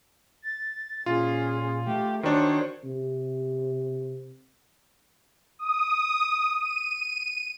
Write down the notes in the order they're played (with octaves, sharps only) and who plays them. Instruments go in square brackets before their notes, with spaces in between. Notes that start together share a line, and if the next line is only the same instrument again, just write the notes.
[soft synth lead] A6
[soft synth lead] A#2 [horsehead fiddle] C#4 G#4 [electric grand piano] F4
[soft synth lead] A3 [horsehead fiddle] G4
[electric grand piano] D#3 D4 [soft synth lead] F#4 [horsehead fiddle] C5 C#5
[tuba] C3
[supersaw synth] D#6
D#7